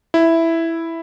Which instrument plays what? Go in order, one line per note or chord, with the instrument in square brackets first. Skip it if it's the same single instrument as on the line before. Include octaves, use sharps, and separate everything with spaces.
[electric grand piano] E4